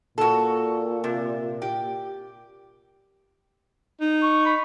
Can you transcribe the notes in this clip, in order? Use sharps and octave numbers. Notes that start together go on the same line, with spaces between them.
A#2 F#4 A4
C3
G4
D#4
C#6
B5